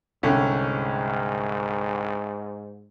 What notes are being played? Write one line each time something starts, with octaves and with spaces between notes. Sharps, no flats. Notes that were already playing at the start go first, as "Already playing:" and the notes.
C2 G#2 D3 C#4